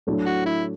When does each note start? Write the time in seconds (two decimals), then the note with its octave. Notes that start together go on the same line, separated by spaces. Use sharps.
0.07 A2 F#3 A3 D4
0.26 F#4
0.46 E4